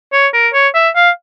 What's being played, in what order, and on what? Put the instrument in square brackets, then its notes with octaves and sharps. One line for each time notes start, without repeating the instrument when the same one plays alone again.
[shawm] C#5
A#4
C#5
E5
F5